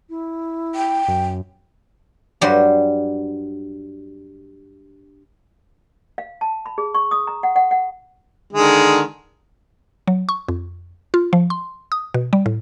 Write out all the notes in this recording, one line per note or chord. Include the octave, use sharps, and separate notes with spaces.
E4
G5
F#2
G2 F#3 G3 C5 C6
F5
A5
B5
G#4
C#6
D#6
A#5
F#5
F#5
F#5
D3 D#3 G#3
F#3
C#6
F2
F4
F3
C6
D#6
B2
G3
A2